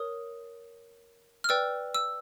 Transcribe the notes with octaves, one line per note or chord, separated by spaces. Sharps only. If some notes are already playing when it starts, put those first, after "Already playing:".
Already playing: A#4 C#5 D#6
F6
B4 D5 G5 E6
E6